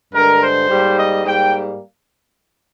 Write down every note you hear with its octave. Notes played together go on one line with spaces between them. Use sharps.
G2 D3 G#3 A#4
C5
G#2 G3 A#3
D#5
G#2 G3 A#3 G5